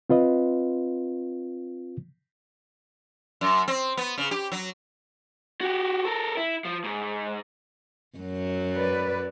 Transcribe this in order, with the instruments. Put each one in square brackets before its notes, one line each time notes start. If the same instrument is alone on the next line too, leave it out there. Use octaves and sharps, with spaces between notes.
[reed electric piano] C4 F4 B4 D#5
[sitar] F#2
C4
B3
C#3
G4
F#3
[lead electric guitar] F#4 G4
A4 A#4
E4
F3
G#2
[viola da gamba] F#2 F#3
[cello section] B4 D5